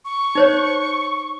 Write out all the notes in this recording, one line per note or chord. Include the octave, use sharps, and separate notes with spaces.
C#6
D#4 C5 C#5